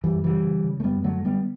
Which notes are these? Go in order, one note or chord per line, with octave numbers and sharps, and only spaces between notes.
F#2 E3 G3
C#3 E3 G3
C#3
C#3
A3
F#2 G3 B3
D3 F#3 A3
D3 G3 B3